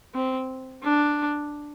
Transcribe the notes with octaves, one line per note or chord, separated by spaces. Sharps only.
C4
D4